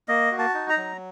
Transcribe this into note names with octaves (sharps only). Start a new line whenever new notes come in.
A#3 D#5
F#4
A5
D#4
A#5
F#3